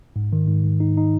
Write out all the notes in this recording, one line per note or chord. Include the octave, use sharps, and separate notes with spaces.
G#2
D#3
G#2
G#2
D#4
D#4